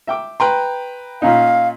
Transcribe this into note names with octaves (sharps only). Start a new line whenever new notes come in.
E5 G5 D6
B4 G5 A#5 C6 F#6
A#2 C#4 D#4 F5